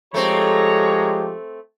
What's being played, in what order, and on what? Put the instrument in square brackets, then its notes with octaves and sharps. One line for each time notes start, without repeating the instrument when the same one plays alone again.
[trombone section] F3 G#3 G4 [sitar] A3 C4 [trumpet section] C#5 A#5